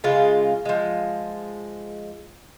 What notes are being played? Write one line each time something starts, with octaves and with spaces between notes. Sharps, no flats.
C#3 G#3 F4
F3 G#3